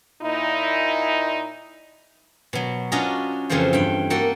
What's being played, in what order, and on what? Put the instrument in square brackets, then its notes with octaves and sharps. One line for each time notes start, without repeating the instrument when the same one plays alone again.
[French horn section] A#2 D#4 E4
[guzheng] B2 F#3
C#4 D4 F4 F#4 D#5 A#5
F2 C#3 E3 A3 F4 C5
G2 G5
A#3 F#4 A4 G5